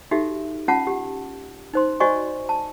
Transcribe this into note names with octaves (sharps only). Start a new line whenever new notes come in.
D#4 F#4 G4 A4 E5
C#4 F4 F#5 A5
G4
D#4 C5 C6
F#4 C5 D5 D#5 G#5 C#6
A5